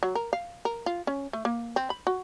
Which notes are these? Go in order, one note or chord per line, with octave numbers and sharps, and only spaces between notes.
F#3
A#4
F5
A#4
F4
C#4
A3
A#3
C4
B5
F#4